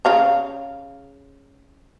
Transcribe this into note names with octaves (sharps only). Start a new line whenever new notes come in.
C#3 F5 A#5